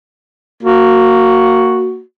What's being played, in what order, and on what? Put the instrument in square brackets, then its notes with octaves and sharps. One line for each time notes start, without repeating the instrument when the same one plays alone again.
[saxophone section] A#3 F#4